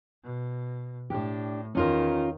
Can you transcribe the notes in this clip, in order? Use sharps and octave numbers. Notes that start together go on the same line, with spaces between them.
B2
A2 D4 G4
E2 D#3 C#4 F4 A#4